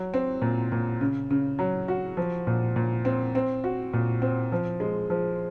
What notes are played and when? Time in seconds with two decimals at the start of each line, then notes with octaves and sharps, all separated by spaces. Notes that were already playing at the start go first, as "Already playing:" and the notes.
Already playing: F#3
0.14 C4
0.42 A#2
0.72 A#2
1.01 C#3
1.31 C#3
1.59 F#3
1.88 F#4
2.17 F3
2.47 A#2
2.76 A#2
3.05 C4
3.35 C4
3.64 F#4
3.93 A#2
4.22 C4
4.52 F3
4.80 G#3
5.10 F3